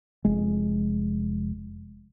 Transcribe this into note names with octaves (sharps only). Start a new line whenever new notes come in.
F1 G#3